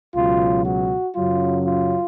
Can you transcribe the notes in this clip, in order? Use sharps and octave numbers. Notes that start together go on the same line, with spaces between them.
C#2 B2 F#3 F4
F#4
F#2 C#3 F#3 F4
F4